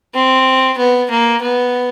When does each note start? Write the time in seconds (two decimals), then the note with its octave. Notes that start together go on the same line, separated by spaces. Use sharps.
0.15 C4
0.78 B3
1.10 A#3
1.42 B3